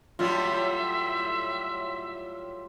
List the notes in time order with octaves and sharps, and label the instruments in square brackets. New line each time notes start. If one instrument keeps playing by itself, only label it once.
[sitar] A2 F#3 G3 [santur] F4 [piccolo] E5